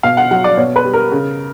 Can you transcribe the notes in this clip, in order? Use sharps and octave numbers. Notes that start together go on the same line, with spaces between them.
B2 F5
F#5
F#3 F#5
D5
B2 C#5
B4
G3
A#4
C#3